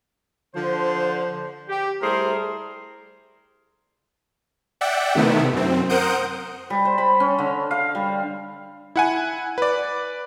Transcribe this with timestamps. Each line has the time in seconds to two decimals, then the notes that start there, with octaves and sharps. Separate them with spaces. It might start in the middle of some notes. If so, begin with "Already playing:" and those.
0.55 D3 F3 C5
1.69 G4
2.02 G3 A3 E4 G#4 A#4 C5
4.81 D5 E5 F#5 G5
5.15 C3 D#3 A3 B3 E4
5.53 F#2 C4
5.89 A#4 C5 F#5 D#6 G6 D7
6.70 G3
6.85 C5
6.98 B5
7.20 C#4
7.39 D3
7.71 F5
7.95 G3
8.96 E4 F#5 G#5
9.58 B4 D5